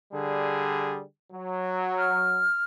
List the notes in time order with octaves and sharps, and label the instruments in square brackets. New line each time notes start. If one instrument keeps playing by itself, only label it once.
[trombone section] D3 G3 G#4
F#3
[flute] F6